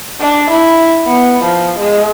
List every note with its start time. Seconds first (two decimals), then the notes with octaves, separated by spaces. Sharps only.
0.20 D4
0.50 E4
1.07 B3
1.44 F3
1.78 G#3